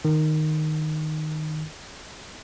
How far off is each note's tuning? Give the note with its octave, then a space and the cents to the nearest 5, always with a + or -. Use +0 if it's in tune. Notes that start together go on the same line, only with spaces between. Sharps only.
D#3 -5